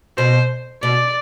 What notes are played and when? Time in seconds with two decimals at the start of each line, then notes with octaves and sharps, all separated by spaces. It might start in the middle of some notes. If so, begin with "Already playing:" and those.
0.17 B2 C5
0.83 B2 D5